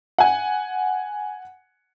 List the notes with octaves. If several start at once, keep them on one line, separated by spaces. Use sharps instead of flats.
F#5 G#5